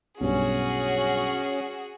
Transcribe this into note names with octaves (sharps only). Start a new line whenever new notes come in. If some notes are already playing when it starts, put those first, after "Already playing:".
B1 G2 C#4 F#4 G#4